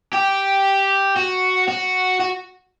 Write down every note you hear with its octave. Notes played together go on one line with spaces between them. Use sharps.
G4
F#4
F#4
F#4